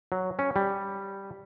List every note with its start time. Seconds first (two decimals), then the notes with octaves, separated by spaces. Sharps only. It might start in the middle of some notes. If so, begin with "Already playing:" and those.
0.12 F#3
0.39 C#4
0.56 G3